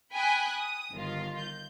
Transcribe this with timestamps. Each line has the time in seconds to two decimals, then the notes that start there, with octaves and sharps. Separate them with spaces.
0.13 G5 G#5 B5 D#6 F#6
0.54 D#6
0.92 G1 D#3 F4
1.38 G6